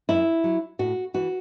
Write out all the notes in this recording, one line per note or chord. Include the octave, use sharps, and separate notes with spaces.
F#2 E4
F#3
A2 F#4
E3 F#4